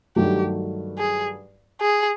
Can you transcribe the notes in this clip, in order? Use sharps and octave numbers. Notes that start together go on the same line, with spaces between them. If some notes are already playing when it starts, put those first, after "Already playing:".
G2 D#3 F#3 A3 G4
G#4
G#4